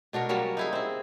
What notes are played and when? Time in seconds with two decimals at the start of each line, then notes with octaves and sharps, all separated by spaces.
0.13 B2 D4 F#4 A#4
0.29 F#3 G3 A#3 C#4
0.57 D#4 E4 G#4
0.73 C4 E4